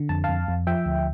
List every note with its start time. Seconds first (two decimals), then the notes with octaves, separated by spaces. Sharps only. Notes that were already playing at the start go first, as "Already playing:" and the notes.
Already playing: D3
0.09 F2 A5
0.24 F2 F5 A5
0.48 F2
0.67 F3 E5 G5
0.86 D2